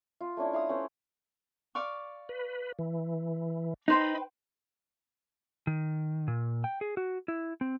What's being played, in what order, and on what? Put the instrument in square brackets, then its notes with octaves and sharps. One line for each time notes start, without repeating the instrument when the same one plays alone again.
[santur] F4
A3 C#4 D4 E4
E4 F5 C6 D#6
C#4 A4 B4 C5
[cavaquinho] D5 F5 C#6
[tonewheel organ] B4
E3
[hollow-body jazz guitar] D#4 [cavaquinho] B4 C5 G5 [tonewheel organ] D#5 B5
[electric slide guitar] D#3
A#2
G5
G#4
F#4
E4
C4